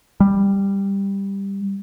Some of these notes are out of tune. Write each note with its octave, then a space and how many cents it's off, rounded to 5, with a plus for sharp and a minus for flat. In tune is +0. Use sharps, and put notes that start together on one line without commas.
G3 +10